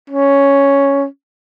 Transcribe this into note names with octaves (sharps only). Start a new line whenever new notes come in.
C#4